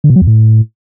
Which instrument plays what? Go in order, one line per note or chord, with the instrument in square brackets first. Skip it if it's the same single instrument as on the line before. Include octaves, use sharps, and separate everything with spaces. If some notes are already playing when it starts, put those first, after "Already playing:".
[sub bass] D3
B2
F#3
E2
A2